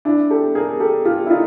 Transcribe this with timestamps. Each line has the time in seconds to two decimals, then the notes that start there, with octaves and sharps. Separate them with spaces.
0.05 D4 E4
0.30 G4 A4
0.55 G#4 A#4
0.80 G4 A4
1.05 F4 G4
1.26 E4
1.30 D#4 F4